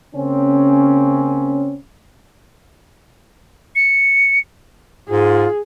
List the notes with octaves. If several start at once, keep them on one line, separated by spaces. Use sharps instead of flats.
C#3 A#3 C4 C#4
C#7
G#2 F4 G#4